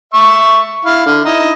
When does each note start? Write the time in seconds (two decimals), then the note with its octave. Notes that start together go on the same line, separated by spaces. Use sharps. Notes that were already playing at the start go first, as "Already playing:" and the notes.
0.14 E5 C#6 E6
0.85 E4 F5
1.06 D3
1.25 D#4 E4 D#5